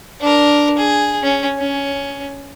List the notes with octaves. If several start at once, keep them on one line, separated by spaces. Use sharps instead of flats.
D4 A#4
G#4
C#4
C#4